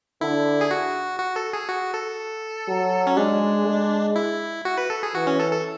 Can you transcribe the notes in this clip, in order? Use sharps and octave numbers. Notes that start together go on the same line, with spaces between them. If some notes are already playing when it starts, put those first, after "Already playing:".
D3 E4
G#4
F#4
F#4
A4
G#4
F#4
A4
F#3
C#4
G#3 D4
G#3
E4
F#4
B4
A4
G#4
E3 F#4
C#4
A4
A4